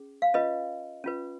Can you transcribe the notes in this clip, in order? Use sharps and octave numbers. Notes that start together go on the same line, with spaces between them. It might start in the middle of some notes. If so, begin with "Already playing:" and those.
Already playing: C#4 G#4
F5
C#4 F4 B4 D#5
C#4 F4 B4